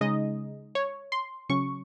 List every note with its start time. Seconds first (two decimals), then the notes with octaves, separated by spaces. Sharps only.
0.01 C#3 G#3 D#4 D#5
0.75 C#5
1.12 C6
1.49 C#3 F#3 C#4 C#6